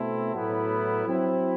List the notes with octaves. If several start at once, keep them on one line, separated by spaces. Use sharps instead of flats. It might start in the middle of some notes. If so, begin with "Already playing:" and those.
Already playing: B2 A3 C4 E4
A2 F#3 B3 E4
F#3 C4 E4